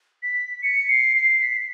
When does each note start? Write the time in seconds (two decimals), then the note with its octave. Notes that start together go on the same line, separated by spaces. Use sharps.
0.23 B6
0.62 C#7
0.89 C7
1.17 C7
1.42 B6